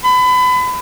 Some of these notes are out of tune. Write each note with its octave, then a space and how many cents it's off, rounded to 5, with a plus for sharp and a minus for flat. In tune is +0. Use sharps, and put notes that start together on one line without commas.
B5 +30